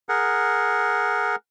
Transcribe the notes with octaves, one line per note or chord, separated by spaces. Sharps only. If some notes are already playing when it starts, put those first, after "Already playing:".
G#4 A#4 F#5